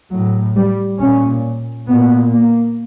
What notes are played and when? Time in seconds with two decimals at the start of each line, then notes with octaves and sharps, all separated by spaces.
0.11 A2 F#3
0.56 G3
1.00 A#2 C#4
1.88 A#2 B3
2.33 A#3